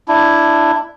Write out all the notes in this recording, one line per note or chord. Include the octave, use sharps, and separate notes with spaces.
D4 E4